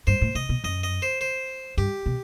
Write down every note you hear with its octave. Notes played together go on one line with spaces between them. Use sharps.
G2 C5
A2
C3 D#5
B2
F#2 D#5
D#5
C5
C5
G2 G4
B2